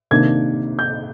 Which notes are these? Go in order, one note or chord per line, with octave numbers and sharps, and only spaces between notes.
C3 D#3 A#3 D4 G#6
G6